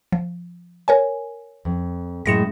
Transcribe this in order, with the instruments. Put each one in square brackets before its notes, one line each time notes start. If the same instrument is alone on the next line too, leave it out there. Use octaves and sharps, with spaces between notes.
[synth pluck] F3
A#4 C#5 G#5
[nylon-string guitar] F2
[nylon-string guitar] F#2 A2 G#3 [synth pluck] A#6 C#7 E7